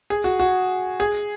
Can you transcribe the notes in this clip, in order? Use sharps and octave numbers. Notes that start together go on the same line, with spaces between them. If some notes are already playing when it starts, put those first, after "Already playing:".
G#4
F#4
F#4
G#4